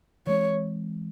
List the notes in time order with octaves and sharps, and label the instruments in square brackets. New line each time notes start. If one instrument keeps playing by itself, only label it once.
[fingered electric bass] E3 G#3 C4 [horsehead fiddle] C#5